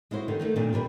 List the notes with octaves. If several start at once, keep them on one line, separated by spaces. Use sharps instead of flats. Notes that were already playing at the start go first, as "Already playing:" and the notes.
G#3 E4 F#4 C5
D3 D#3 G3 D#4
D#3 G3 A3 A#3
A#2 D3 D#3 C4 D4
A#2 G3 A#4 B4